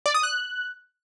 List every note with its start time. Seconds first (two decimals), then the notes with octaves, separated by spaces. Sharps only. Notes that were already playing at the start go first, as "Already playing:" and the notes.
0.06 D5
0.14 D#6
0.23 F#6